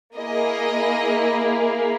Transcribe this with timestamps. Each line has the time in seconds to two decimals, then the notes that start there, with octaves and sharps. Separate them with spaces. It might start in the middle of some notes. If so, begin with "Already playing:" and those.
0.16 A#3 E4 G#4 D#5